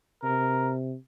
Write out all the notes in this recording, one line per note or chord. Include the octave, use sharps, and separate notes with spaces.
C3 A#4